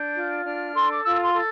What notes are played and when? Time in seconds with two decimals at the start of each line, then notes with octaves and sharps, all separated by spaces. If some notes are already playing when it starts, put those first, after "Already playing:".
Already playing: D4 G6
0.16 F4
0.45 D4 F6
0.75 A4 C6
0.90 D6
1.05 F4 E6
1.24 C6
1.33 A4